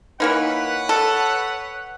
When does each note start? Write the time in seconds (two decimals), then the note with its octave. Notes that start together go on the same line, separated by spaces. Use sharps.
0.20 E3 A#3 D#4 B4 C#5 F#5
0.89 A4